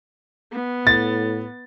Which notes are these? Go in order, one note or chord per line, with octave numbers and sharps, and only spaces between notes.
B3
A2 A6